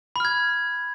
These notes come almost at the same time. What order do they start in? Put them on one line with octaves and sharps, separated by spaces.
B5 F6 G#6